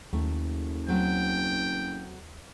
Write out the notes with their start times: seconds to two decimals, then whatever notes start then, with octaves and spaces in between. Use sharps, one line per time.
0.13 F#1 D#2 A3
0.88 F#3 A3 C4 G5